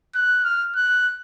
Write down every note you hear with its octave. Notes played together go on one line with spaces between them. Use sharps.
F#6
F6
F#6